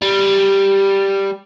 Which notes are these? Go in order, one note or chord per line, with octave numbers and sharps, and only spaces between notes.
G3